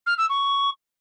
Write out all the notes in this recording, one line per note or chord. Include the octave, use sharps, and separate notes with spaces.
F6
E6
C#6